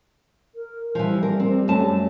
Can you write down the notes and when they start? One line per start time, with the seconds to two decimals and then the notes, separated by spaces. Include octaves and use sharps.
0.55 A#4
0.95 E3 F3 G3
1.23 A#4
1.40 C4
1.68 F#2 A3 A5